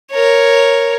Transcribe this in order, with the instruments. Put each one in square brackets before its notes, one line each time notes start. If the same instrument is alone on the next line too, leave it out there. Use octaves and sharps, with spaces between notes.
[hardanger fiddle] A#4 C#5